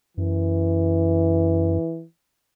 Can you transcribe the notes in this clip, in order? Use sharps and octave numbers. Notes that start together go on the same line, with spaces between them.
F#2 E3